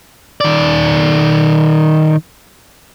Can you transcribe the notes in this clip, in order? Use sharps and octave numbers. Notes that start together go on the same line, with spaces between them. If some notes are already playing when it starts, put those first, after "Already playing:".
D#3 D5